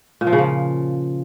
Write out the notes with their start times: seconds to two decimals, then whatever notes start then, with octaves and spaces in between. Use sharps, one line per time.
0.21 A#2
0.27 F3
0.33 C#3
0.38 F3